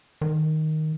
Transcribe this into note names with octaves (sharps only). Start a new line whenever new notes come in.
D#3